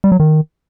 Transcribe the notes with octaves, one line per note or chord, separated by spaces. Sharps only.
G3
F#3
D#3